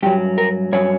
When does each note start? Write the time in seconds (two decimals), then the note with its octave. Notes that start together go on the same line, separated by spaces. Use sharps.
0.03 G2 F#3 G4
0.38 A#4
0.72 G2 F#3 C#5